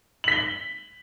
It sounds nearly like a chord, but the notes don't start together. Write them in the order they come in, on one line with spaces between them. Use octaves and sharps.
F#7 B6 G7